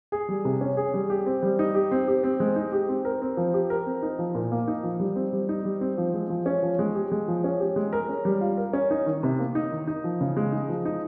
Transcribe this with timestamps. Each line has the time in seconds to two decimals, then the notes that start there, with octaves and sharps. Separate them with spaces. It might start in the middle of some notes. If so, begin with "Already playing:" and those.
0.12 G#4
0.29 G3
0.45 C3
0.61 C#4
0.77 G#4
0.94 G3
1.10 G4
1.26 C4
1.43 G3
1.59 D#4
1.75 G4
1.91 C4
2.08 G4
2.23 C4
2.40 G#3
2.56 D#4
2.72 G4
2.89 C4
3.05 A#4
3.22 C4
3.37 F3
3.54 G4
3.70 A#4
3.87 C4
4.03 D#4
4.19 F3
4.34 A#2
4.51 A#3
4.68 D#4
4.83 F3
5.00 G3
5.16 C4
5.33 G3
5.49 D#4
5.65 G3
5.81 C4
5.98 F3
6.14 G#3
6.30 F3
6.46 C#4
6.62 F3
6.79 G#3
6.95 G4
7.12 G#3
7.28 F3
7.44 C#4
7.60 G4
7.76 G#3
7.93 A#4
8.09 C#4
8.25 G3
8.41 F4
8.57 A#4
8.73 C#4
8.90 D#4
9.06 D#3
9.23 C3
9.39 A#3
9.55 D#4
9.71 D#3
9.87 D#4
10.04 F3
10.21 C#3
10.37 G#3
10.52 D#4
10.69 F3
10.85 D#4